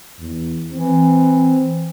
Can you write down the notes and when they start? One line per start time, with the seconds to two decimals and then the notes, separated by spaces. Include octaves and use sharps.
0.19 E2
0.74 E3 C4